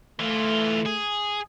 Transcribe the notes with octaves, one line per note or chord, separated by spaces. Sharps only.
E3 A3 F4
G#4